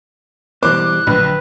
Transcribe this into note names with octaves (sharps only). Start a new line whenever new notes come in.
B2 E3 G3 C5 D6 F#6
A#1 D3 F#3 B4